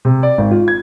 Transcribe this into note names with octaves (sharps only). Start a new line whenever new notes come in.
C3
D5
G#1
F4
G#6